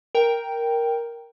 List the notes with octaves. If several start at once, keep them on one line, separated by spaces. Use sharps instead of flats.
A#4 G5